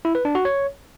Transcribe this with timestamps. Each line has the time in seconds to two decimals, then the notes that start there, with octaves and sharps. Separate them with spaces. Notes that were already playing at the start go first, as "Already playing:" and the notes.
0.05 E4
0.15 B4
0.25 D4
0.35 F#4
0.45 C#5